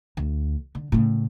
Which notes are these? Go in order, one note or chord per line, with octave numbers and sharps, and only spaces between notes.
D2
D3
A2 C#3